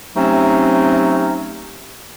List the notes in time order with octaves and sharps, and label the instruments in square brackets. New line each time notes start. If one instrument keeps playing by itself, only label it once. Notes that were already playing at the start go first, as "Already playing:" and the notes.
[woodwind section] C3 F#3 A3 C4 C#4 D#4